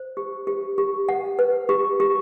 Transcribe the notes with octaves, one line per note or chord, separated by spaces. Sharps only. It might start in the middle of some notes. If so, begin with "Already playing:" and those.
Already playing: C5
G4
G4
G4
F#5
B4
G4
G4